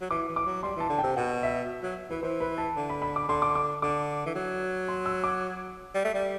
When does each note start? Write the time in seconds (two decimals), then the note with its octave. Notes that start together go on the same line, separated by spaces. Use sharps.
0.01 F#3
0.10 E3 D6
0.28 E3
0.36 D6
0.46 F#3
0.63 G3 C6
0.76 E3 A5
0.89 D3
0.99 C3 G5
1.16 B2 F#5
1.43 E5
1.83 F#3
2.10 E3 B4
2.23 E3 C5
2.40 B4
2.58 A5
2.76 D3
2.89 B5
3.02 B5
3.16 D6
3.28 D3 C6
3.42 D6
3.55 D6
3.82 D3 D6
4.26 E3
4.35 F#3
4.88 C6
5.06 E6
5.24 D6
5.94 G3
6.05 A3
6.15 G3